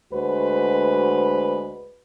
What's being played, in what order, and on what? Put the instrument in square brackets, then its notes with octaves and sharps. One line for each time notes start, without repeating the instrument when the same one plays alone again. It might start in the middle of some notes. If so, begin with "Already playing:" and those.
[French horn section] D2 G#3 F#4 B4 C5